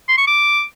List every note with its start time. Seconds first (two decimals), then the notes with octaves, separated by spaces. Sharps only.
0.08 C6
0.18 C#6
0.27 D6